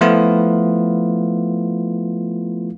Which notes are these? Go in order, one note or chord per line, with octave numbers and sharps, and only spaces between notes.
F3 A3 B3 E4 F4